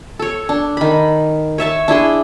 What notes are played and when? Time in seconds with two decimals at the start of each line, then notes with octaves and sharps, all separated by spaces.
0.19 A4 C#5
0.49 D4
0.77 D#3 B5
1.58 C#5 E5 A5 C#6
1.88 D4 E4 G#4 C6